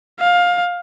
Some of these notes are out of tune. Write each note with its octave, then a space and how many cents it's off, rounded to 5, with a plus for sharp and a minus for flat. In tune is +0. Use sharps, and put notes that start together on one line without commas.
F5 +20